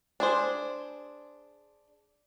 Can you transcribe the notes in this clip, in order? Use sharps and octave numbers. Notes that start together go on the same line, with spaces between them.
D4 G#4 C5